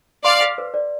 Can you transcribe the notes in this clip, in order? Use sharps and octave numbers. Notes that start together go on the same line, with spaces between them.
D5 F5 C6
F5
B4
D5